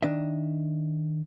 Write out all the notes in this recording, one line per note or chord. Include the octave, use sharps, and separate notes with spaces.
D#3 D4 D#5 E5